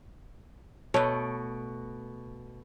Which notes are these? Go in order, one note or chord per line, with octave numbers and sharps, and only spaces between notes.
B2 A3 B4 C#5